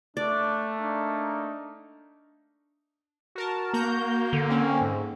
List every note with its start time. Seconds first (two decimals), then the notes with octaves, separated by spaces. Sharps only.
0.17 A3 D4 D5
0.79 A#3 D4 D#4
3.35 F#4 A#4 A5
3.73 A#3 F#4 A#5 G6
4.33 D3
4.50 C4 C#4
4.81 G#2